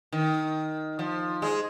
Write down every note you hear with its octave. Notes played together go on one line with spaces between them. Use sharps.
D#3
F3
G#3